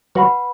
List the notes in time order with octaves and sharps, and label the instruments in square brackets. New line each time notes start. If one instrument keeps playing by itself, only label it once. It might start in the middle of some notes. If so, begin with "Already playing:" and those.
[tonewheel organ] F#3 F#4 [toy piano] B4 F#5 B5